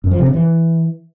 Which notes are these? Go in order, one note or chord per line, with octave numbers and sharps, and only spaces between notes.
F#2
F3
C3
C#3
E3